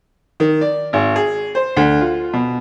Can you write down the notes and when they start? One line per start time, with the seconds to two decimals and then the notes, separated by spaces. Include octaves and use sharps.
0.40 D#3
0.61 D5
0.93 G#1
1.16 G#4
1.55 C5
1.76 D2
2.01 F4
2.33 B2